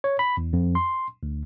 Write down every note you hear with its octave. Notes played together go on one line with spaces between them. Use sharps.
C#5
B5
E2
F2
C6
D2